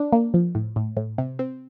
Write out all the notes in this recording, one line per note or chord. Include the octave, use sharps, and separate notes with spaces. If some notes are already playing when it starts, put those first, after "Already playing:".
Already playing: D4
A#3
F3
A2
A2
A2
C3
C4